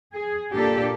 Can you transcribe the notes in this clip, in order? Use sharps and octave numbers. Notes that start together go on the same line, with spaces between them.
G#4
A#2 A#3 D4 G4 A4